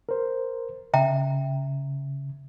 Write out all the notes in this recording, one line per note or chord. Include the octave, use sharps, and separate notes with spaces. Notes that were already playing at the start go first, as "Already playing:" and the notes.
A#4 C5
C#3 E5 G5 A#5